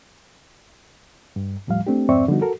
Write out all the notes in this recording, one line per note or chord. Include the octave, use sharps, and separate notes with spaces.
G2
D#2 A2 F3 G3 F5
A3 C4 D4 G4
F2 G#2 C4 D5 E5 C#6
D3 F3 G3 B3 D#4 F#4
F#4 A4 A#4